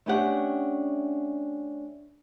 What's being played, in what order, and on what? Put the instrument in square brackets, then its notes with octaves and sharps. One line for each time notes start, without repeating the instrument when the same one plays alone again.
[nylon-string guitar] A3 B3 C#4 D4 G4 F#5